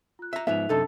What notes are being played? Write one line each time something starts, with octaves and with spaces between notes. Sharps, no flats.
F4 F#6
E5 A#5
G#2 F3 B3 D#4 E5 F#6 F7
F#2 C3 D4 D#4 A4 D#5 A5